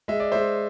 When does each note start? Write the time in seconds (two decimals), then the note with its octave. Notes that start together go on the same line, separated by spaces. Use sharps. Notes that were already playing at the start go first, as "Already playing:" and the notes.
0.08 G#3 E5
0.20 D5
0.32 G#3 C5 E5